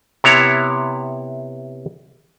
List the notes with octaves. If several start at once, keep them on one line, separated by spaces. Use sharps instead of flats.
C3 B3 E4 C#5 A#5